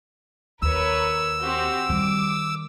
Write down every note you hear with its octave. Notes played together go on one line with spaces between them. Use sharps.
D#2 A#4 B4 C#5 E6
C4 F#4 G4
D#3 G3 D6